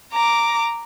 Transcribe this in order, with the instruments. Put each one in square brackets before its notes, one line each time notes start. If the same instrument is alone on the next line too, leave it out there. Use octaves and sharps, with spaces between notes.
[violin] A#5 D6